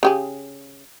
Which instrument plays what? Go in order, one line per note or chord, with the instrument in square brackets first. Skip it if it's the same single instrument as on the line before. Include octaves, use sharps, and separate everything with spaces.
[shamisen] C#3 G4 G#4